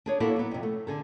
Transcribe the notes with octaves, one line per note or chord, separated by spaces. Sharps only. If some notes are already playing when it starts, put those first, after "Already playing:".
D4 G#4 C#5
A#3 B3 D4 E4 F#4 A4
F#3 B3
F2 C3
A3
D3 G#4 A4